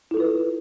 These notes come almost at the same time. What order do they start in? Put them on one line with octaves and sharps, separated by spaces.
E4 A4 F4 B4